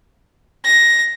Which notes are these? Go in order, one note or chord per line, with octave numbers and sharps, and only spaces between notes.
A#6